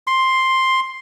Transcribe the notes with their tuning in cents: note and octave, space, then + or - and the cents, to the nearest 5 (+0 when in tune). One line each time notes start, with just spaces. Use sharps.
C6 +5